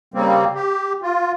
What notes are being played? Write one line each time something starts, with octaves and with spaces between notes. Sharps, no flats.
C#3 G3 A#3 C4
G4
F4